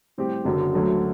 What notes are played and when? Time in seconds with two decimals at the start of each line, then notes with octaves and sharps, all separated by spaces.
0.18 A2 G3 C4 G4
0.45 F#1 F#2 D3 F#3
0.74 D2 D3 F#3 A3